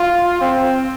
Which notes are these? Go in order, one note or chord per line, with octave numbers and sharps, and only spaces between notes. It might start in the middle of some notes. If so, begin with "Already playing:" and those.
Already playing: F4
C4